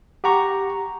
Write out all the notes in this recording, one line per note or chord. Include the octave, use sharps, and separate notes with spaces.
G4 F#5 A#5 C#6